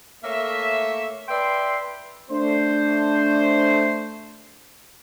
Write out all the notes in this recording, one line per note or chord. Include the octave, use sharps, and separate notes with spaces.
A3 A#3 C#5 E5
B4 D5 E5 G5 C6
A3 D4 C5